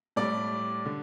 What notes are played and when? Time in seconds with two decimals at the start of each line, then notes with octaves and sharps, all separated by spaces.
0.16 A2 G3 A4 D5
0.85 D3